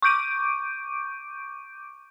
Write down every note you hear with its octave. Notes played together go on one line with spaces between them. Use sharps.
C#6 D6 G6 D7 D#7